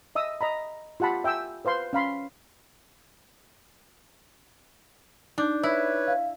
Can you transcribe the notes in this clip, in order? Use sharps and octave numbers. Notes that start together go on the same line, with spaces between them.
D#5 E5 D#6 E6
D#5 A#5 B5
F4 G4 F#5 A5 B5
E5 G5 G#5 E6
B4 C5 F5 C6
C#4 F5 B5 C6
D4 D#4 D6 G6
E4 B4 C#5
F5